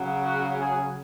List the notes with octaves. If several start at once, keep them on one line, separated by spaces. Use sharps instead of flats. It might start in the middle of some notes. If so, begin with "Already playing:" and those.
Already playing: C#3 F#3
F#4
G#4